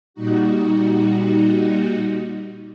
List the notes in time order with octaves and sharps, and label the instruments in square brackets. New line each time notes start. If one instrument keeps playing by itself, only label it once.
[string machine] A#2 G3 D#4 F#4